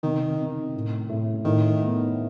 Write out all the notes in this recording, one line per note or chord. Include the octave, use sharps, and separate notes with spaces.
C3 D#3
C3
A2
A2
A2 D#3
B3